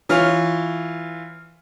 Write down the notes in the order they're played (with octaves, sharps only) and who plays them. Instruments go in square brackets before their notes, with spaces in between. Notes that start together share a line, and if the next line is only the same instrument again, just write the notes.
[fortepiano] E3 F4 C#5